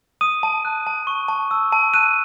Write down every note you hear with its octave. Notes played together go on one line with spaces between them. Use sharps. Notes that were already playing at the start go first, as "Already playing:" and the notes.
D#6 D#7
A5
F#6
A5
C#6
A5
E6
A5
F#6 D#7